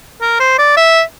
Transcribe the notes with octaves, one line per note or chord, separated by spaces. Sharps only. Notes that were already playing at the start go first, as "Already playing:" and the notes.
A#4
C5
D5
E5